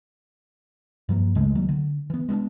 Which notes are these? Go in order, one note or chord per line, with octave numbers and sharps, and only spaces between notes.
G2 F3 G3 A#3
C#2 C#3 G#3 A3
D#3 F#3 A#3
D3
E3 B3
G#3 B3 C4 D4